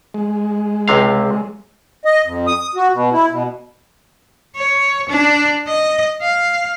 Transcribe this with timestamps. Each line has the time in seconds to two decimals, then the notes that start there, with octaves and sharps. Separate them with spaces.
0.14 G#3
0.88 C#2 C3 F5
2.05 D#5
2.25 F2
2.47 D#6
2.76 F#4
2.93 B2
3.13 E4
3.31 B2
4.56 C#5
5.09 D4
5.67 D#5
6.21 F5